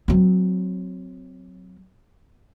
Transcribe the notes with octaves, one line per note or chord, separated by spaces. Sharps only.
F#3 C4